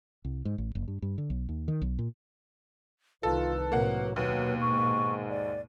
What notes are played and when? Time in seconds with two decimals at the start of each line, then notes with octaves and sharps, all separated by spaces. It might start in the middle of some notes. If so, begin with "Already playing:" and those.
0.25 C2
0.45 G#2
0.58 A1
0.75 F#1
0.88 G2
1.02 G2
1.18 D3
1.30 B1
1.49 D#2
1.68 D#3
1.82 B1
1.99 A#2
3.23 C2 D#3 F4 A4 B4
3.72 A2 C3 F#3 A#3 F#5
4.16 D#2 B2 F#3 A#3 B4
4.61 G#2 C#6
5.30 D5